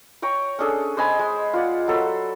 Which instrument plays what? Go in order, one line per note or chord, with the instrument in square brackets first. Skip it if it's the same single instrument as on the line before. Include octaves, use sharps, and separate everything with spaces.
[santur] C#5 G5 A#5 C#6
C#4 D4 G#4 A4
C5 D#5 G#5 B5
G#3
F4 D5 F#5
F#3 A4 C5 B5